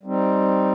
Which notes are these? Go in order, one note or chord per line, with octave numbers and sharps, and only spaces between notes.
G3 C4 D#4